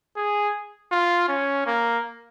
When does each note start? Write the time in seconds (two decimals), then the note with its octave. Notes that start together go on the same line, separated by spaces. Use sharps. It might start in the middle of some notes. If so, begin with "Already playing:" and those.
0.17 G#4
0.92 F4
1.29 C#4
1.66 A#3